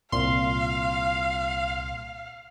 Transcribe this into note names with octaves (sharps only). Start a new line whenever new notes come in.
C2 A#2 F5 C6